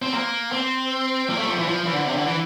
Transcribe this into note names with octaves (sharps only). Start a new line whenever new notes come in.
C4
A#3
C4
A#3
A3
G3
F3
E3
F3
E3
D3
C3
D3
E3